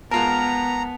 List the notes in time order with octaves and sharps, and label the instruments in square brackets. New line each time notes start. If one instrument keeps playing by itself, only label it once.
[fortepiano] G#2 F4 A#4 [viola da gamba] B3 [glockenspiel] A5 F7 [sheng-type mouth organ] A#5